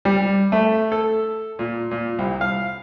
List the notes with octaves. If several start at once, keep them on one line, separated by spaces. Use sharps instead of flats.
G3
A3
A4
A#2
A#2
C2
F5